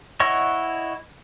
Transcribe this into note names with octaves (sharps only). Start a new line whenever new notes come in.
E4 C#5 D#5 F#5 C#6